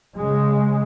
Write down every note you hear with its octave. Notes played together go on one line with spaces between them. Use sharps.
C#3 G#3